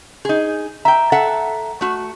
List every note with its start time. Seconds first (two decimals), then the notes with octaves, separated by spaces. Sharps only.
0.25 D#4 G#4
0.85 E5 G5 A#5
1.12 A4 E5 F#5
1.81 A3 F#4